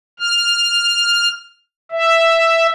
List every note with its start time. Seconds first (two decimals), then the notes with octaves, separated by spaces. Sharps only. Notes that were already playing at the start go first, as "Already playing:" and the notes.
0.19 F6
1.92 E5